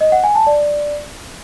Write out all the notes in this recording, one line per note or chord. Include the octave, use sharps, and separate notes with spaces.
D#5
F#5
G#5
A5
D5